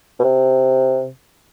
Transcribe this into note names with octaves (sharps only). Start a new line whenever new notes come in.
B2
C3